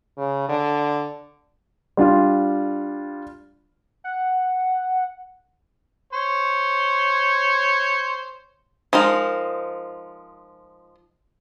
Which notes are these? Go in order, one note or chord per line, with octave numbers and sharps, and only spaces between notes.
C#3
D3
G3 D4 F4
F#5
C5 C#5
F3 G#3 D#4 A#4